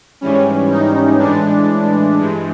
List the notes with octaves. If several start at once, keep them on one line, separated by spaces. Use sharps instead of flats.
G#2 E3 G3 C#4
D#4
A2 E3 G#3 D4
G2 E3 G#3